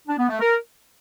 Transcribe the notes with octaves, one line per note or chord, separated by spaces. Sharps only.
D4
B3
A3
A#4